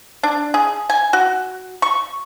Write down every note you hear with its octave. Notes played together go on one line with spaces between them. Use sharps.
D4
G#4
G#5
F#4
C#6